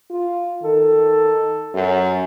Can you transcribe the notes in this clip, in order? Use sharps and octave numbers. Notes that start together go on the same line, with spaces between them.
F4
D#3 A4
F#2